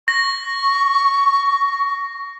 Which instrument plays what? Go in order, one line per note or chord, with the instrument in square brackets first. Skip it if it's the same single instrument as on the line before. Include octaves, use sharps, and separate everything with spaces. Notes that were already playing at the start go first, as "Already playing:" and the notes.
[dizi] C#6 [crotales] A#6